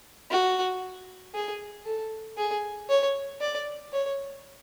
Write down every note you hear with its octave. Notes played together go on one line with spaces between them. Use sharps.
F#4
G#4
A4
G#4
C#5
D5
C#5